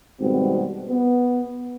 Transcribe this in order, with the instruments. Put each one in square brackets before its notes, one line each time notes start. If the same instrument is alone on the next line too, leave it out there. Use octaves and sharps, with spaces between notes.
[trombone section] G#1 B2 G3 B3 C4 F#4
B3